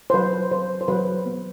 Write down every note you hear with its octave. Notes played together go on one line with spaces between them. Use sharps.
C5
F#3 B4
F#3 C5
C5
F#3 B4
B3